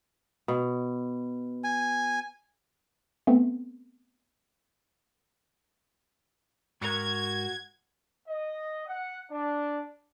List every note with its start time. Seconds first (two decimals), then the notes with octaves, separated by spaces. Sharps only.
0.48 B2
1.64 G#5
3.27 A3 B3 C4
6.81 G#2 F#4 A#4 G#6
8.27 D#5
8.87 F#5
9.31 D4